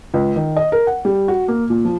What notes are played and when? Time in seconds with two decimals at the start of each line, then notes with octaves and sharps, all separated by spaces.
0.14 C#2
0.36 D#3
0.56 D#5
0.72 A#4
0.87 F#5
1.05 G3
1.28 F#4
1.48 A#3
1.70 A#2
1.85 F3